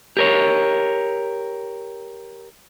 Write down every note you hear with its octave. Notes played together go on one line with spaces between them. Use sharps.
G4 A#4 C#5